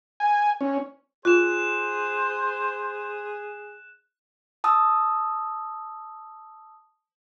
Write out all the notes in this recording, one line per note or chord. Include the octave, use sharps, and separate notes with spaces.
G#5
C#4
F4 G#4 C5 F#6 E7
A5 D#6 E6